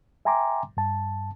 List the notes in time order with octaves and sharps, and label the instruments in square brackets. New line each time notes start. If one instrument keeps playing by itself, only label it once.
[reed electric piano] E5 G5 G#5 A#5 C6 D6
G2 A5